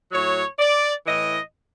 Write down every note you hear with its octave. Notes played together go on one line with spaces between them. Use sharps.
A2 F#3 C#5
D5
A2 E3 D#5